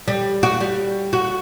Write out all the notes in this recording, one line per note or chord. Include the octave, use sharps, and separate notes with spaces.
G3
F#4
G3
F#4